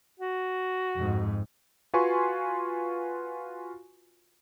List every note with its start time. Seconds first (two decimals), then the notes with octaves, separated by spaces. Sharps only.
0.20 F#4
0.96 F2 G#2
1.94 F4 F#4 B4 G#5 C6 C#6